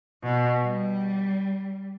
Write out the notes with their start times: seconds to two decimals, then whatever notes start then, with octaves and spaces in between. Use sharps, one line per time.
0.23 B2
0.63 G3